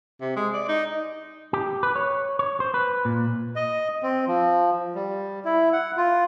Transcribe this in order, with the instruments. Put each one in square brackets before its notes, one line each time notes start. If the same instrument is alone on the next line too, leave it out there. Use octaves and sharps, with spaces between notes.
[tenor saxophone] C3
G#3
D5
D#4
[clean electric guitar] G4
B4
C#5
C#5
C5
B4
A#2
[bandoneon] D#5
C4
F3
G3
E4
F#5
F4